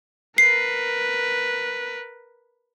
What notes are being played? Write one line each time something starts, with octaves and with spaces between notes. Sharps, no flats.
A#4 B4 C7